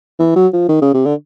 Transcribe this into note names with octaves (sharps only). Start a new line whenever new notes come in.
E3
F#3
F3
D#3
C#3
C3
D3